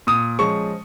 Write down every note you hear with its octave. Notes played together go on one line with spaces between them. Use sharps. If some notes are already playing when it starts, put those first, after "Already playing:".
A#2 D#6
F3 G#3 C#4 C#6